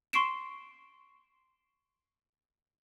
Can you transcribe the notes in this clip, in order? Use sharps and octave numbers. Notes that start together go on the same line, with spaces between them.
C6 C#6 C7 D7 E7